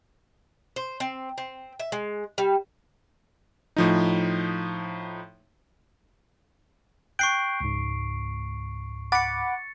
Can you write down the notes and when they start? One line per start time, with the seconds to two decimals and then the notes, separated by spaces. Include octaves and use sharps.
0.76 C5
1.00 C4
1.38 C4
1.80 E5
1.92 G#3
2.38 G3
3.77 A2 F3 D#4
7.19 G5 C#6 F#6 G6 C7 D7
7.61 C#2 G#2
9.12 F#5 B5 D6 A6 C#7